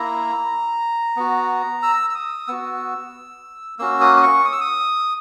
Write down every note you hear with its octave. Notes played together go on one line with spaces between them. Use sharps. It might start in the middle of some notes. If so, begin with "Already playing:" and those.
Already playing: A#3 E4 A#5
B3 F#4
E6
E6
D#6
B3 F#4 E6
A#3 C#4 F#4 E6
D#6
D#6
C#6
D#6
E6
D#6